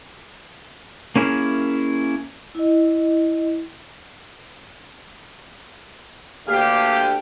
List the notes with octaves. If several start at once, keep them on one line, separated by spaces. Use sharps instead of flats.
A#3 C#4 E4 G#4 A#4
E4 D#5
D2 D3 A#3 G4 F5